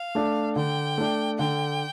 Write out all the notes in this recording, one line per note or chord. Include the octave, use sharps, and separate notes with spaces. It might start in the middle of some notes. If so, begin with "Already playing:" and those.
Already playing: F5
A3 D4
D3 G5
A3 D4
D3 G5